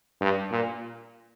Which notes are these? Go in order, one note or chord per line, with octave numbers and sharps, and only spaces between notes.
G2
A#2